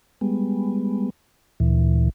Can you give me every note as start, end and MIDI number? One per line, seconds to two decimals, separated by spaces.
0.21 1.10 55
0.21 1.10 56
0.21 1.10 59
1.60 2.09 38
1.60 2.09 46
1.60 2.09 52